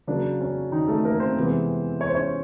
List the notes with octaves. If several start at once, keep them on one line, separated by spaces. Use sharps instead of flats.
C#3 F#3 A#3 D4
C#4
D#3 D#4
A3 A4
A#3 A#4
C4 C5
C3 E3 G#3 B3
C#5
C5
C#4 C#5